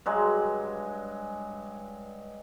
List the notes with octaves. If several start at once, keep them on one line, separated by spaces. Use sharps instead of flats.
G2 F#3 G#3